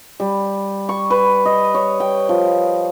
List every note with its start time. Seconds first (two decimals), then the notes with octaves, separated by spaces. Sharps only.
0.20 G3
0.89 C#6
1.10 B4
1.45 D#5
1.75 C#5
2.00 G5
2.29 F3